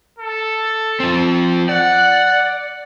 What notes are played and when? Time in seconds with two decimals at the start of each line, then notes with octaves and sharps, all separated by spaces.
0.18 A4
1.00 F3 C4
1.69 D5 F#5